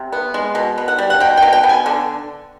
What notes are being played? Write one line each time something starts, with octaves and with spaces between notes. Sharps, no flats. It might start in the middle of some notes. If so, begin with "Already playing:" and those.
Already playing: C3
B3
G#3
B2
B3
F#5
G3
F#5
B2 G5
G5
B2
G5
B3
G#5
D3